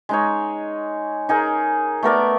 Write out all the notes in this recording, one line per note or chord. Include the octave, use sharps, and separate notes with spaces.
G#3 D#4 C#5
D#4 G#4 A#4
A3 B3 A#4 D5